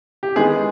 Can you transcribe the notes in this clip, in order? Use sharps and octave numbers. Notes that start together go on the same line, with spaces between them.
G4
D#3 G#3 B3 G#4